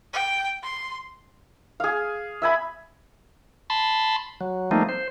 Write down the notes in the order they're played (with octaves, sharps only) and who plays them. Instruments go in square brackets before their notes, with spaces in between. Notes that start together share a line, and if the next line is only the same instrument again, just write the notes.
[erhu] G5
C6
[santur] G#4 F5
E5 G#5 B5
[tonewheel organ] A5 B5 C6
F#3
F3 G3 A3 A#3 C4 D#4
C5